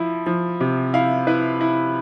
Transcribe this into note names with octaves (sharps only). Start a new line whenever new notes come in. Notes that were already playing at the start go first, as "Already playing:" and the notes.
Already playing: F3 E4
F3
C3
E4 F5
E4 B4
E4